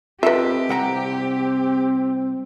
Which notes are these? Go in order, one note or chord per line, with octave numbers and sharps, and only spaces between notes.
C4 F4 G4 A4 B4 D#5 E5
C2 F#5 A#5